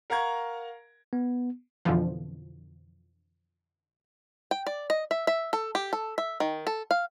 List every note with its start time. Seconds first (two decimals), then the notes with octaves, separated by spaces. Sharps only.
0.10 A#4 F5 F#5 A#5 C#6 G#6
1.13 B3
1.85 F2 B2 D3 E3 F3
4.51 G5
4.67 D5
4.90 D#5
5.11 E5
5.27 E5
5.53 A4
5.75 G4
5.93 A4
6.18 E5
6.40 D#3
6.67 A4
6.91 F5